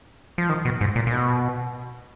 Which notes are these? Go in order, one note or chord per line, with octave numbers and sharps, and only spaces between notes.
F3
D#3
B2
G#2
A#2
A#2
B2